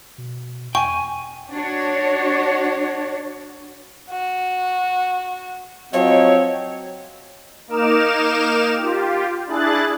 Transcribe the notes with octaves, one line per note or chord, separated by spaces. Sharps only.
B2
E2 G5 G#5 C#6
D4 F#4 C#5
F#4
F3 F#3 C4 C#5 D#5 G5
A#3 D#4 A#4 D6 F6 E7
F4 G4
D4 E4 G#4 F#6 A6